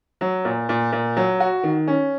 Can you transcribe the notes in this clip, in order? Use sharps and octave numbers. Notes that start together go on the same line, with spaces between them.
F#3
A#2
A#2
A#2
F#3
F#4
D#3
C#4